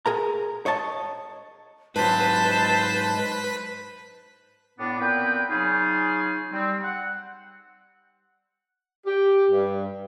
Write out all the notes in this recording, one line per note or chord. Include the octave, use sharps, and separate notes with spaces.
G#4 A#4 A#5
C#5 D#5 A5
G#2 F#3 B4 C5 A5 B6
A2 B3 D4
A#2 B3 C4 B4 G5
C#3 F#3 D#4 F4 G#4
G3 C4
F#5
G4
G2